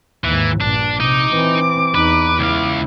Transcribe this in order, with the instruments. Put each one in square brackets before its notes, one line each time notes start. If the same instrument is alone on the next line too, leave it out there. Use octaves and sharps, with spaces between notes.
[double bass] D#2 G#2 [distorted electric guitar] E3
[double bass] A#1 G2 [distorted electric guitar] D4
[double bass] C3 [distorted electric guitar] D#4 D#5 [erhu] D6
[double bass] E3 C4
[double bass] E2 D#4 [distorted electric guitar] B4
[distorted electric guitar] C#2 F5 [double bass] E4